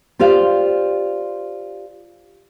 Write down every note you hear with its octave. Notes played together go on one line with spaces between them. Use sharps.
F4 G4 C5 D5 F5